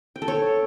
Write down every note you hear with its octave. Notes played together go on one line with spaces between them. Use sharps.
G5
A4
C#5